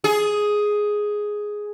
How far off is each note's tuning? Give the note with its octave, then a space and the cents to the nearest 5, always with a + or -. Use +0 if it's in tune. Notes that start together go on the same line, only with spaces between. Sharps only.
G#4 +5